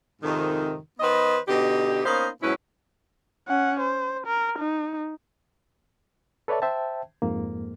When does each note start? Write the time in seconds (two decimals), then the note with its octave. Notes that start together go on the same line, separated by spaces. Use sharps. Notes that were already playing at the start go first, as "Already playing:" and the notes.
0.22 F2 G#2 C3 D#3
0.99 D#3 B3 B4 C5 D#5
1.48 B2 D3 D#4 G4
2.05 A#3 B3 C#4 D#4 C5 F5
2.42 G#2 B2 F#3 C#4 E4 B4
3.48 C#4 F#5
3.80 C5
4.27 A#4
4.59 D#4
6.48 A4 B4 C#5 D5 E5 A5
6.62 C5 E5 G5 A5
7.22 F2 G#2 A#3